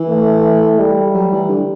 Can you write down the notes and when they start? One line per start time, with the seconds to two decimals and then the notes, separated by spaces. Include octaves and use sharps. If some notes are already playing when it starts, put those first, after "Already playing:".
Already playing: E3
0.10 A3
0.79 G3
1.14 F#3
1.32 E3
1.49 D3